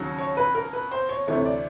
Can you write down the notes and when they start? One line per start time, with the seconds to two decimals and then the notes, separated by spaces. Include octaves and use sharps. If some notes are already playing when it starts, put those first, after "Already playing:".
Already playing: D#2 C#3 F#3
0.19 C#5
0.37 B4
0.55 A#4
0.73 B4
0.91 C5
1.09 C#5
1.27 D2 C3 E3 A3 C#5
1.45 D5